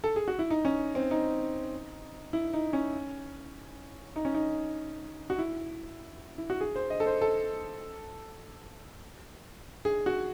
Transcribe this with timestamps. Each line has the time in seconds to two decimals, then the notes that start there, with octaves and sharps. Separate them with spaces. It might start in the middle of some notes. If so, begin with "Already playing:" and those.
0.04 A4
0.16 G#4
0.28 F#4
0.39 E4
0.50 D#4
0.65 C#4
0.95 C4
1.11 D#4
2.33 E4
2.54 D#4
2.73 C#4
4.16 D#4
4.25 C#4
4.34 D#4
5.30 F#4
5.38 E4
6.38 E4
6.50 F#4
6.61 G#4
6.76 C5
6.90 D#5
7.00 A4
7.06 C5
7.21 A4
9.85 G#4
10.06 F#4